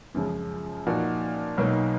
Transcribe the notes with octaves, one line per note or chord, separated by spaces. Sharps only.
F#2 C#3 F3 G#3
A#2 F3 A#3 D#4 F#4
B1 B2 F#3 A#3 D#4